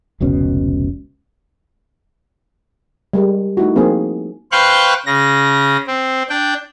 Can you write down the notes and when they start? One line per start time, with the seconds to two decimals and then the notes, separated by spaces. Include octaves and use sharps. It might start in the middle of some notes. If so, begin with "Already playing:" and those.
0.20 F1 C#2 B2 C#4
3.13 G3 G#3 A#4
3.57 A3 D#4 E4 F#4
3.76 F3 A#3 C4 D#4 G#4
4.52 B4 C5 F5 G5 C#6 F#6
5.06 C#3 A#6
5.87 C4
6.29 D4 G5